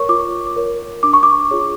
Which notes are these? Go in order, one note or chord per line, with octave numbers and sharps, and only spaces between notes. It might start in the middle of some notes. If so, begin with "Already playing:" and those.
Already playing: A#4 C#5 C#6
F4 D6
A#4 C#5
D4 D6
C#6
D6
F4 G#4 C#5